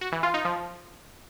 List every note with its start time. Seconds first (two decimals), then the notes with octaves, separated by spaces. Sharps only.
0.01 F#4
0.12 E3
0.23 F4
0.34 D#4
0.45 F3